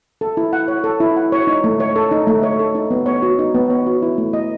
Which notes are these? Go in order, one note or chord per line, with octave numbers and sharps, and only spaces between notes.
A4
E4
F#5
C#5
A4
E4
F#5
C#5
D#4
A3
C#5
A4
D#4
A3
C#5
A4
D#4
B3
C#5
F#4
D#4
B3
C#5
F#4
E4
A3
D#5